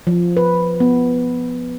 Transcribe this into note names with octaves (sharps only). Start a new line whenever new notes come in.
F3
B4
B3